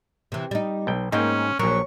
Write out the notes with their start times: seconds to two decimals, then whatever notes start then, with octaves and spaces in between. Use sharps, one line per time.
0.32 C3 E3
0.51 G3 D#4
0.87 B1 G5
1.12 G#2 A#3 C#4 D#4 G5
1.59 A#1 F#3 A#4 C#6